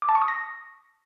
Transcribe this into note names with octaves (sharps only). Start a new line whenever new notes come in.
D6
A5
C#6
D#6
A#6